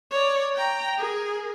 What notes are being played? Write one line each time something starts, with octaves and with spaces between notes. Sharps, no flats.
C#5 D5
G5 A#5
G#4 A#4